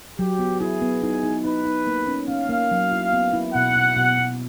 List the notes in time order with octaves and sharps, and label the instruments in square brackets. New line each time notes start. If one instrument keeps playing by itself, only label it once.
[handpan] F#3 [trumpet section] G4
[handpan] B3
[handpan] E4 [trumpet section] G#4
[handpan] B3
D#4
D#4
[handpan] D#4 [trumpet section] B4
[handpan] D#4
A#3
C#4
[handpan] C#4 [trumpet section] F5
[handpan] A#3
F#3
E4
B3
E4
[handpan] B2 [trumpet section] F#5
[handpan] B2
B2
B2